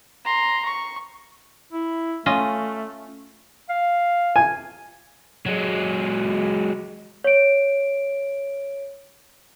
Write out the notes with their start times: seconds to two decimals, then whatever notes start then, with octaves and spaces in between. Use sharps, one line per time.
0.25 A#5 C6
0.65 C#6
1.73 E4
2.26 A3 C#4 F4 D#5
3.70 F5
4.36 G#5
5.46 F#3 G#3
7.24 C#5 D7